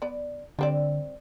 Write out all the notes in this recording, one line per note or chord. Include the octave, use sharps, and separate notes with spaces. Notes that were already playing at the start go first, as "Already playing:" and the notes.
B3 D5
D3 G3 C4 D5